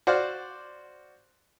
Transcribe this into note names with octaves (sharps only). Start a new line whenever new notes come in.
F#4 C5 D5 F5